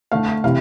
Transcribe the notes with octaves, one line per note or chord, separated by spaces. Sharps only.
D3 A3 F5
C3 E3 F5